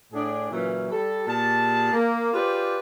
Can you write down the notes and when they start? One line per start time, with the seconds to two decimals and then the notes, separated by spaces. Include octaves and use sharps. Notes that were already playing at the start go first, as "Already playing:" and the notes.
0.13 A2 D4 G#4
0.51 A#2 C#3 E3 F#3 C#4 E4
0.91 G3 A4 A5
1.27 A#2 G4 G#4 A5
1.93 A#3
2.34 F4 G4 G#4 B4 C5 D5